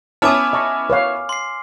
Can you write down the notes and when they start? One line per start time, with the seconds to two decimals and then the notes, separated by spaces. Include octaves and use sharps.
0.22 B3 C#4 E4 G#5 A5 D6 D#6 F6
0.53 D#5 A5 C#6
0.90 B4 C#5 F5
1.29 C6 C7